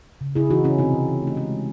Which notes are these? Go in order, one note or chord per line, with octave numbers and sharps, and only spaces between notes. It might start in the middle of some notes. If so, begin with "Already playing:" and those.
C#3
C#3 E4 G#4
E3 D#4 F#4
C#3 C#4 E4
C3 C4 D#4
C3
E3
A3
D#4
G#3 C#4
G#3